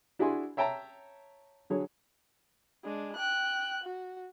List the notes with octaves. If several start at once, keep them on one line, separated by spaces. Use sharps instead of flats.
D4 E4 F#4 G#4 G#5 C6
C#5 E5 G5 A5 A#5
D3 F#3 G#4 C#5
G#3 D4
G5 F#6
F#4